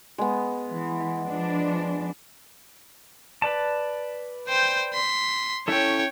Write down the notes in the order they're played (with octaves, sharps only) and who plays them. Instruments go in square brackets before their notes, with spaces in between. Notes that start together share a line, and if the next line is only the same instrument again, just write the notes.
[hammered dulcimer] G#3 B3
[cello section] E3
F3 D4
[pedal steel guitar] B4 D5 A5
[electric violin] C5 G5
C6 B6
[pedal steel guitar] C#4 E4 A4 [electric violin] C#5 G5